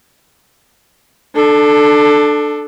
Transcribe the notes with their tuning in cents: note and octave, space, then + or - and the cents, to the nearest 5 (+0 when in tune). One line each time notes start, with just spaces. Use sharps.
D4 +20 A4 -5